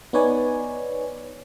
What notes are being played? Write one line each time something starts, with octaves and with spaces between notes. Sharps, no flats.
B3 D#4 B4 C#5 D5 G#5